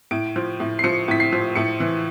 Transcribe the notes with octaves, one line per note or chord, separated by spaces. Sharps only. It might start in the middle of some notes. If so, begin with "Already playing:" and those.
A2 D7
F3
A2
C7
F3 C#7
A2 B6
C7
F3
A2 C#7
E3